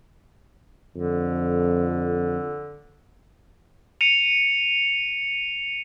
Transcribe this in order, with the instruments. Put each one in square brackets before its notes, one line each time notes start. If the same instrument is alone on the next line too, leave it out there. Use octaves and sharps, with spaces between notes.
[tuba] F2 [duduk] D3
[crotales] C#7 D#7 F7